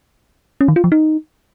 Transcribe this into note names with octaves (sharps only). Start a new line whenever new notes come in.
C#4
D#3
F4
F3
D#4